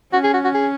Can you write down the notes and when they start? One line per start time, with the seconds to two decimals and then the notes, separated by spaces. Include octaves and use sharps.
0.13 C#4 F#4
0.24 G#4
0.34 F#4
0.44 F#4
0.54 G#4